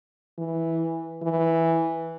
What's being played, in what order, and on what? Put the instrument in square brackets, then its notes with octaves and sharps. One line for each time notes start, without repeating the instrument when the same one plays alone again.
[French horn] E3
E3